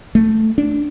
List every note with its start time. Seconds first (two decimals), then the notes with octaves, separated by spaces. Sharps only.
0.15 A3
0.58 D4